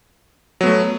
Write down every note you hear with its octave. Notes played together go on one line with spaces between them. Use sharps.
F#3 A3 B3